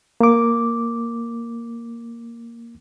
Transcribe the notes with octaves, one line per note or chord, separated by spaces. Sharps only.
A#3 D6